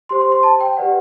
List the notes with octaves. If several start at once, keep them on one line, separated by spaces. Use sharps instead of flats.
G4 C5 C6
C6
C6
A5
G5
G4 B4 D5 F#5